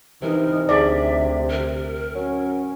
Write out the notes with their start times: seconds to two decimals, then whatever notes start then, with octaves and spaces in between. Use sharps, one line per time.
0.22 C3 E3 D#4 A#4
0.69 D2 G#4 D5 E5
1.50 A#4
2.15 F#3 C#4